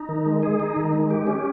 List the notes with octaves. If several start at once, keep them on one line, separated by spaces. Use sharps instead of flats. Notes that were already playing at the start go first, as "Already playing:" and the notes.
Already playing: D#4
D#3
G#3
G#4
D#4
D#3
G#3
G4
C#4